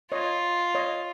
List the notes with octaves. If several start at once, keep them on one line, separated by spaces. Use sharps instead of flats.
F4 C#5 D#5
C#5 D#5